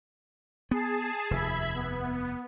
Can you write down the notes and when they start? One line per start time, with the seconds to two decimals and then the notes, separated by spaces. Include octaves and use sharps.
0.71 B3 G#4 A5 C7
1.31 F1 D#2 E5 B5 G#6
1.74 B3